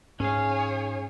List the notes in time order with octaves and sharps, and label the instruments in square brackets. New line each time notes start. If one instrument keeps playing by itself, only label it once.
[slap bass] G#2 [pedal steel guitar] C#4 F5 [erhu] G#4 [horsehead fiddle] C#5 G#5